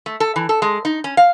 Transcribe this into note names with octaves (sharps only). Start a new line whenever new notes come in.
A3
A4
E3
A4
G#3
D#4
C#4
F5